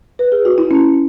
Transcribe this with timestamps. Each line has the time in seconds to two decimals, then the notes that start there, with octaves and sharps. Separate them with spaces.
0.19 B4
0.32 G#4
0.45 F#4
0.58 E4
0.71 C#4